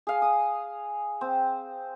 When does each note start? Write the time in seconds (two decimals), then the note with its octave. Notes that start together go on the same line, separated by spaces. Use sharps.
0.07 G#4 F5
0.22 D#6
1.21 C4